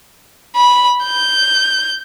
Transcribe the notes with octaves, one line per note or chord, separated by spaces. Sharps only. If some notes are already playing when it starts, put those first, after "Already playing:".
B5
G6